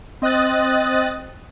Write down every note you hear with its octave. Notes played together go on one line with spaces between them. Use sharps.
C4 D#5 D#6 F#6 A6